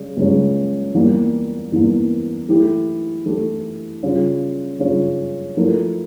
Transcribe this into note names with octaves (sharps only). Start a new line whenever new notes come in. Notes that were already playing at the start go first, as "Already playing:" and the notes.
Already playing: C#3 G3 C#4
C#2 C#3 G3 C#4
E2 E3 G3 A#3
E2 E3 G3 A#3
E3 A3 E4 G4
E3 A3 E4 G4
C#3 G3 C#4 F4
C#3 G3 C#4 F4
F3 A3 E4 A#4